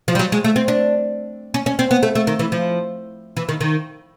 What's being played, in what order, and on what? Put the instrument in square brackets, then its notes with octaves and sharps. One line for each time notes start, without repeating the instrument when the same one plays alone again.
[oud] F3
G3
F#3
G#3
A3
C4
D4
C#4
C#4
C4
B3
A3
A3
D#3
E3
F3
E3
D#3
D#3